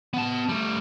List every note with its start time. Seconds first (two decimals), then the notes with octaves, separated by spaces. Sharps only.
0.13 B3 A5
0.49 G3 A3